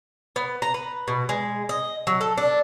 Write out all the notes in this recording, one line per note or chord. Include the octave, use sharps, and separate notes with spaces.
B3
A#5
B4
B2
G#3
D#5
F#3
A4
D4